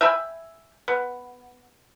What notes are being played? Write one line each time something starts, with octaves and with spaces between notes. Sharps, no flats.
E5 G5 G#5 B5
B3